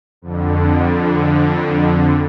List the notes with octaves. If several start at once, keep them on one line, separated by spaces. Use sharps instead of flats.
F2 D3